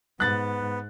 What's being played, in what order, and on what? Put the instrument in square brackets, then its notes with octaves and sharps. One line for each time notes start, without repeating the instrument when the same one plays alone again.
[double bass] G#2 [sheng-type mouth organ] B3 [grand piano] F#6 A6